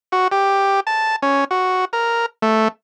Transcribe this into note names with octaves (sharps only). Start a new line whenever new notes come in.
F#4
G4
A5
C#4
F#4
A#4
A3